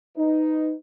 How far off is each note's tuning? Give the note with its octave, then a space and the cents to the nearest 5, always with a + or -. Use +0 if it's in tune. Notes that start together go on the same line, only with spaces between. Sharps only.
D#4 +0 B4 +25